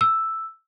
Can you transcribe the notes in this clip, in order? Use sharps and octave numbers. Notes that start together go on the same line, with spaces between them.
E6